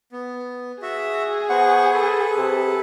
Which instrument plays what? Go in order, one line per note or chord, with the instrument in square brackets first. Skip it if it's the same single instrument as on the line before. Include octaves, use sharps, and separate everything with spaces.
[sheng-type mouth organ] B3
[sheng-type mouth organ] F#4 E5 [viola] G#4
[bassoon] B3 [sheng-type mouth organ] C5 F#5 C#6
[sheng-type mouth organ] A4 B4
[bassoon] C3